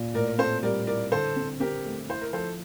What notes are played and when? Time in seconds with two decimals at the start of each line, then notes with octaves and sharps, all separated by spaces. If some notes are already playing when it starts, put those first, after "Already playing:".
Already playing: A#2
0.14 A2 A#4 D5
0.27 A#4
0.38 C4 A4 C5
0.63 G3 A#4 D5
0.87 E4 A#4 D5
1.12 D3 A4 C5
1.36 C4
1.60 C4 G4 A#4
1.85 A3
2.09 E4 C5
2.21 A#4
2.33 F3 A4 C5